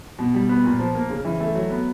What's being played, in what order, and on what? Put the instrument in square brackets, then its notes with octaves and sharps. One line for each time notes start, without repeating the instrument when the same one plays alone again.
[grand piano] B2
G3
B3
A#2
F3
A#3
C#3
E3
A3
F#3
B3